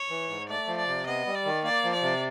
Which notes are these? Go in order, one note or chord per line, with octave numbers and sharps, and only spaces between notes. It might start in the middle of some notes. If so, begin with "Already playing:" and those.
Already playing: C#5
E3
G#2
A3 D5
F3
D5
C3
B3 D#5
G3
D5
D#3
A#3 D5
F3
D5
C3